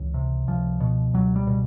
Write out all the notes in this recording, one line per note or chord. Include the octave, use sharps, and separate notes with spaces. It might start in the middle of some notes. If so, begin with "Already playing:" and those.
Already playing: C#2 E3
C3
C#2 F3
B2
C#2 F#3
G3
B2